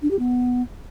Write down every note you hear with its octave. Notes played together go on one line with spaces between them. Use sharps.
D4
G4
B3